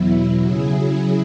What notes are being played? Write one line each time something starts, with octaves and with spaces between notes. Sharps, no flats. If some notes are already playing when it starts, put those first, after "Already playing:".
Already playing: E2 B2 F#3 E4
C#3 F#3 E4 G#4